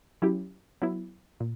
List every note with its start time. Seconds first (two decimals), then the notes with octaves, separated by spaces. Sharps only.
0.22 F#3 C#4 E4 G4
0.82 F#3 B3 E4
1.40 A#2